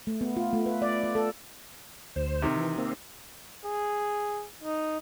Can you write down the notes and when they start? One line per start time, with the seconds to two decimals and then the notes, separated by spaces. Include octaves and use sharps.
0.07 A3
0.21 B3
0.37 F4
0.53 A3
0.66 B4
0.82 D5
1.04 F4
1.15 A4
2.16 D2 C5
2.42 C3 D#3
2.56 E3
2.78 A#3 C4
3.65 G#4
4.63 D#4